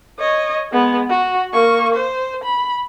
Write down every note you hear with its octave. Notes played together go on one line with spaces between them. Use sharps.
C#5 D#5
G#3 B3
F#4
A#3 C#6
C5
B5